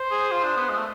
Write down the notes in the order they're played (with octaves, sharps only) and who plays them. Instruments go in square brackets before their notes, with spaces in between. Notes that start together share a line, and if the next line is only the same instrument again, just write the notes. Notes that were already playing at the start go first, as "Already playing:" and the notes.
Already playing: [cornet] C5
[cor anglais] G#4
F4
D4
B3
G#3
A3